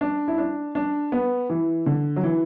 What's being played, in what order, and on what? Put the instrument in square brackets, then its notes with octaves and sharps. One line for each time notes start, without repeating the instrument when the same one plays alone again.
[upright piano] D4
E4
D4
D4
B3
E3
D3
F#3
E3